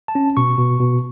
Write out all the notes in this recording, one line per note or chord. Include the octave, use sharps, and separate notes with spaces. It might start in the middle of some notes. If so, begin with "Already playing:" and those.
A5
C#4
B2 C#6
B2
B2